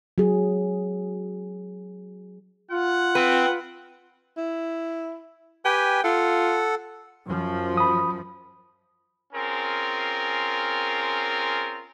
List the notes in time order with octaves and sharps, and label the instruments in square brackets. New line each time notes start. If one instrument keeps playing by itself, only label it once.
[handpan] F#3 G#4
[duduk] F4 [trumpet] F#5
[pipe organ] C4 [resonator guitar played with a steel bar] B4
[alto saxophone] E4
[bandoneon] G4 B4 G#5 [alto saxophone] G5
[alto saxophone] F4 [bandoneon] A4 F#5
[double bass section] F#2 F3
[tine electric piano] B5 D#6
[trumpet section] C4 C#4 F4 G#4 A#4